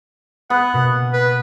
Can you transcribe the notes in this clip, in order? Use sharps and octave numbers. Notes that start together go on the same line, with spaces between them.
B3 F#5
B2 A#3
B4